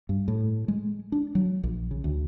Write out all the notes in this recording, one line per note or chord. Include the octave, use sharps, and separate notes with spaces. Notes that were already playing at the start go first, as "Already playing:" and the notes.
G2
A2
G#3
D4
F#3
A#1
C#3
D2